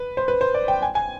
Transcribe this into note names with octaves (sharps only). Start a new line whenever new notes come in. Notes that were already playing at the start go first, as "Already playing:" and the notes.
Already playing: B4
C5
B4
C5
D5
G5
G#5
G#5